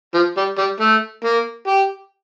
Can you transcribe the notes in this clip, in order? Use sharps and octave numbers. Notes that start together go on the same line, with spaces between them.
F3
G3
G3
A3
A#3
G4